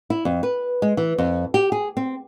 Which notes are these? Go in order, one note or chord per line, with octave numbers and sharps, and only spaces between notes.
E4
F2
B4
G#3
E3
F2
G4
G#4
C4